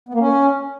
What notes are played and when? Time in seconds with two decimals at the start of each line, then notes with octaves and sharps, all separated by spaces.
0.09 B3
0.14 A#3
0.20 C#4